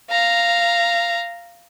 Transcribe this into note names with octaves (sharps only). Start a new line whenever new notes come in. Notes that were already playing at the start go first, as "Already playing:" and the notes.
F5 A#5